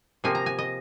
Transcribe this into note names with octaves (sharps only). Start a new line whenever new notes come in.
C3 F3 A#3 G#5
A#5
G#5
D#5